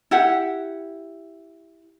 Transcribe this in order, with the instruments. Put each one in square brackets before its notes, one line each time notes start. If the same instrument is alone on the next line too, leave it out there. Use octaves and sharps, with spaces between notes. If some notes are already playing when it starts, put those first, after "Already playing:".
[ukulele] E4 G4 F#5